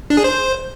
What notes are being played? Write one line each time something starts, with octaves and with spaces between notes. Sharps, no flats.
D4
G#4
C5